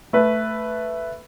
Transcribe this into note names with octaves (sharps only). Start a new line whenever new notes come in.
A3 B4